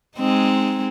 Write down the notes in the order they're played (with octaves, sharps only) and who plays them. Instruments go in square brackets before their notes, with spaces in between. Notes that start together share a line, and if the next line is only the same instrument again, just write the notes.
[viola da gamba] G#3 C4 D#4